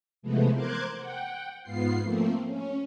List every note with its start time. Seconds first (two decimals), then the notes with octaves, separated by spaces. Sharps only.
0.22 C3 E3 F3 G#3 A3 B3
0.52 A#4 C5 C6 D6 F#6 G#6
0.97 F#5 G5
1.63 G#2 B3 F4 C7
2.01 F3 A3 A#3 C4
2.45 C#4